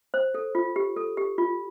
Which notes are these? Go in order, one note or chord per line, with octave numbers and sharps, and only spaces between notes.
C5
A4
F4
G4
A4
G4
F4